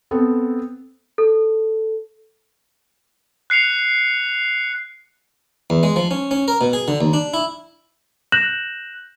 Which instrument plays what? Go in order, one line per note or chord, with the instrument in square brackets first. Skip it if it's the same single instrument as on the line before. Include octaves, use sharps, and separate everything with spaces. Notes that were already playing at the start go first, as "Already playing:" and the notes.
[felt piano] B3 C4 A4
[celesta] A4
[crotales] F#6 C7 C#7 F7
[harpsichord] E2
G#3
F3
C#4
C#4
A#4
B2
G#4
D3
D#2
D4
E4
[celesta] F#6 G6 A#6 E7 F#7